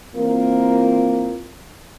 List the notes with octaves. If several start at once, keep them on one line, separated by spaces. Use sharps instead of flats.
E3 A#3 C4 F4 A#4